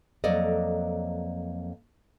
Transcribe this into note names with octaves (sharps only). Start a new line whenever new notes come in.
F2 F#3 A#3 A4 D5 D#5